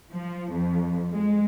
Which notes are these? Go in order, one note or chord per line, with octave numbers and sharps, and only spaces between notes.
F3
F2
G#3